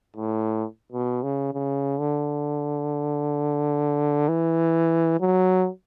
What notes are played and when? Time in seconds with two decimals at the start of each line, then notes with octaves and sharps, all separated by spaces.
0.17 A2
0.93 B2
1.23 C#3
1.53 C#3
2.00 D3
4.29 E3
5.20 F#3